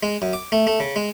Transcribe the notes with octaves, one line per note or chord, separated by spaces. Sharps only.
G#3
F#2
D6
A3
A3
C#3
G#3